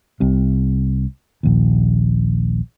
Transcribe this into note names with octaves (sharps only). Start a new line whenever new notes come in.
C2 C3
A#1 D#2